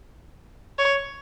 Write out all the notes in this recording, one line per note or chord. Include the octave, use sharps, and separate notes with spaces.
C#5